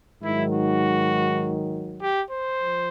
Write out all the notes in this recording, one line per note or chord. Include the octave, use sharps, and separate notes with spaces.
G#2 D#3 F#3 E4
F#4
G4
C5
F3